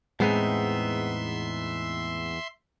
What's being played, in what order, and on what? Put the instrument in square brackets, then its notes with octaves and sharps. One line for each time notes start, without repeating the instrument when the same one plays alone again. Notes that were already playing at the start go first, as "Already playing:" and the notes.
[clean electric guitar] E2 B3 D#4 [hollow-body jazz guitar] A2 [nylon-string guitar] G#3 C4 [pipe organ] E5 C6